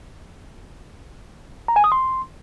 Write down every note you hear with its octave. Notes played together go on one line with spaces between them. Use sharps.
A#5
G#5
D#6
C6